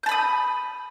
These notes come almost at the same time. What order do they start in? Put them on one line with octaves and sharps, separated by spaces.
G6 A5 B5 D#6